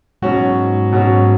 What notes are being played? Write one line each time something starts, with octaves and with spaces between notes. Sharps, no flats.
G#2 B2 F#3 C#4 F#4
B2 F#3 C#4 F#4